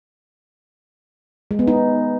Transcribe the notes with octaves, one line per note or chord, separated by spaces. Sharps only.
G#3
B3
D#4